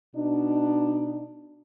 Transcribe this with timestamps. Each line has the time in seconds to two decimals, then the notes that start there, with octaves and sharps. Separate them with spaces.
0.16 B2 D4 D#4